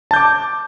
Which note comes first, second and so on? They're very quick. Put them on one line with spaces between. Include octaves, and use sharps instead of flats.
A5 G6 D6